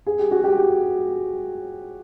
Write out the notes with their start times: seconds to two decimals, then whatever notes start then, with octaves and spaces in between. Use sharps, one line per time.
0.06 G#4
0.19 G4
0.31 F#4
0.44 G4